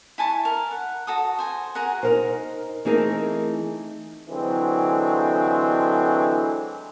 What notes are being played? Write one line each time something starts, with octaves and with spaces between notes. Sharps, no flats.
E4 G#5 A5 C#6
A#4
F#5
F#4 A4 D#6
C5 G#5
F#4 G#4 A#4 F#5
D#4 A#4 C5
E3 A3 C4 D#4 G#4 A#4
D3 E3 F#3 G#3 C4